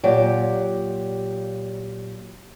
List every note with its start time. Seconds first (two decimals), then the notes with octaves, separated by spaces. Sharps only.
0.04 A#2 F#3 G4 D5